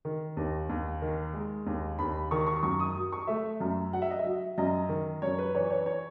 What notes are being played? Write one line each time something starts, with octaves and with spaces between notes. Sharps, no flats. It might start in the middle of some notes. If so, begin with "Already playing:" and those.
D#3
D#2
D#2
D#3
G#3
D#2
D#2 B5
D#3 C#6
C#6
F#2 C#6
D#6
F#3
C#6
A3 E5
F#2
F#3 F#5
E5
D#5
E5
F#3
F#2 D#5
D#3
F#2 C#5
B4
E3 C#5
C#5
C#5